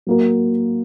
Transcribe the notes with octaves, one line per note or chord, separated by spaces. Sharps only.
F#3 A#3 F#4 A#4